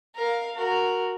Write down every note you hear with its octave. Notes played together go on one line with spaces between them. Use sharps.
A#4 F5
F#4 A#4